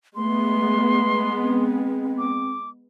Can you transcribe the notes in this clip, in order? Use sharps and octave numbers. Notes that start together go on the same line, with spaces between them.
G#3 A3 B3 C6
C4
D6